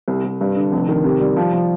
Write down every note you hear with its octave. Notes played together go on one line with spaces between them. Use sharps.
C2
C2
G2
D3
F1
D#3
C3
G3
F3
F3